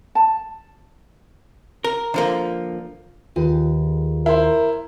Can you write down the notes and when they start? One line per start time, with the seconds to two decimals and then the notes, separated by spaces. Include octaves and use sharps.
0.15 A5
1.84 A#4
2.14 D3 F3 A#3
3.36 D#2 F4 G#4 B4
4.26 E4 A#4 C5